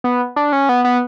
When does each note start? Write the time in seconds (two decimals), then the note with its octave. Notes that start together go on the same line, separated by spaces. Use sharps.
0.04 B3
0.36 D4
0.53 C#4
0.69 B3
0.84 B3